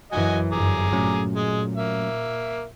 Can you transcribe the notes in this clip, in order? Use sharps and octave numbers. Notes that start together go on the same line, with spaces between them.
F#2 E3 F#4 D#5 G#5
G1 F#2 G#4 A#5 D6
A#2 F#3 A3 C#4
G#3 G#4
A#3 E5